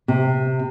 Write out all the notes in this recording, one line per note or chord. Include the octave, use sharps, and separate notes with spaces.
C3